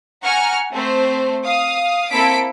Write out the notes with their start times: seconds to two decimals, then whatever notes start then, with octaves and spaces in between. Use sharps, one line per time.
0.24 F#5 G#5 A#5 C#6 F6
0.72 A3 C4 C5
1.43 F5 D#6
2.11 A#3 C4 E4 A4 B6 D7